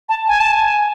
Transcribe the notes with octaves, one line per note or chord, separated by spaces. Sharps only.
A5
G#5
A5
G#5